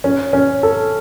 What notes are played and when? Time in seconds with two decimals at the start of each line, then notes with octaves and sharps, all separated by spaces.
0.04 C#4
0.33 C#4
0.63 A4